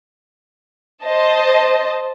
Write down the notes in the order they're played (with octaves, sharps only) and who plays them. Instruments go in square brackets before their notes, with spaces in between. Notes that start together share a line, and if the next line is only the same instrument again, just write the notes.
[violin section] C5 D#5 A5